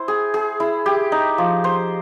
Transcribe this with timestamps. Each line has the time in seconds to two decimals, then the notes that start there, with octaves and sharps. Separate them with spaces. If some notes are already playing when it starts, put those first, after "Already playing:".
Already playing: E4 C5
0.08 G#4
0.34 G#4
0.60 E4
0.86 G4
1.12 D#4
1.38 F3
1.64 C5